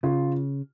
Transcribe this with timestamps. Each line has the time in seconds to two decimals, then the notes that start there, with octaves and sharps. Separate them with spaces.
0.03 C#3 F4